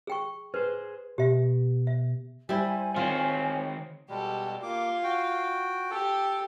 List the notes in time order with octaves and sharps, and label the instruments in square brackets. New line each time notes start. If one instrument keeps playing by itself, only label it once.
[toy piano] G#4 G5 C#6
[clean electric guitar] G#4 C5 [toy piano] B4
[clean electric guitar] B2 [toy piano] G4 E5
[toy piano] E5
[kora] G3 E4 [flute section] C5 G#5
[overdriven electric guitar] D#3 C4 [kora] F4 [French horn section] C#5
[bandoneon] B2 G3 G#3 [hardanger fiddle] G4 A4
[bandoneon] A#3 D6 [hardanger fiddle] F4
[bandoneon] F#4 G5
[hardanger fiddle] G4 [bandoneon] A4